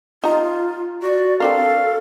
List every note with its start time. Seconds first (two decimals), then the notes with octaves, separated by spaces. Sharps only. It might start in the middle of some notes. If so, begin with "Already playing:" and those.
0.24 D#4 F4 A#5
1.03 F#4 D5
1.40 C4 D4 A4 A#4 F5